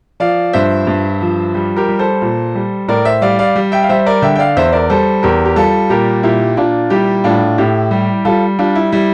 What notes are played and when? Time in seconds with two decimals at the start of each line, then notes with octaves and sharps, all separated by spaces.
0.20 F3 D5 F5
0.53 G2 C5 E5
0.87 G2
1.21 F3
1.54 G3
1.76 G4 A#4
1.89 G3
1.99 A4 C5
2.22 A#2
2.55 G3
2.88 A2 A#4 D5
3.05 C5 E5
3.22 G3 D5 F5
3.39 D5 F5
3.56 G3
3.72 E5 G5
3.83 F5
3.89 G3 C5 E5
4.06 A#4 D5
4.22 D3 E5 G5
4.36 G5
4.39 D5 F5
4.56 E2 C5 E5
4.72 A#4 D5
4.90 G3 A4 C5
5.23 E2 G4 A#4
5.45 G4
5.56 G3 F4 A4
5.90 A#2 G4 A#4
6.23 A#2 E4 G4
6.57 A#2 D4 F4
6.90 G3 E4 G4
7.24 A2 D4 F4
7.58 A2 E4 G4
7.91 G3
8.25 G3 F4 A4
8.59 G3 D4 F4
8.75 E4
8.92 G3 E4